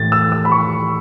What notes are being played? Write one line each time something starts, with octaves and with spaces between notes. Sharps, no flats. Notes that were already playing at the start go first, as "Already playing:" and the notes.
Already playing: A2 E3 A6
E6
E6
B5
C#6